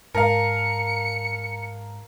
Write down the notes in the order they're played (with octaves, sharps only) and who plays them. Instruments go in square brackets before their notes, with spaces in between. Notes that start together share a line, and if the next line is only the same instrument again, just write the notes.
[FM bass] G#2 [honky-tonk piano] A#4 F5 [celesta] A5 A#5 [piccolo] C#7